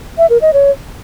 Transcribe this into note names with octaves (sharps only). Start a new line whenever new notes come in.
E5
A#4
D#5
C#5